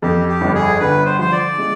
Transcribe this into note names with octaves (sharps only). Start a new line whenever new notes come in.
F2 G4
G4
G1
G#4
D3 B4
C5
F3 C5
D5
G#3